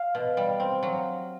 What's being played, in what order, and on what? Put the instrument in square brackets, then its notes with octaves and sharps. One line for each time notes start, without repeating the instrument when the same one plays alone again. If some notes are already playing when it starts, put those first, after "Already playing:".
Already playing: [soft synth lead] F5
[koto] B2
G3
C4
F#3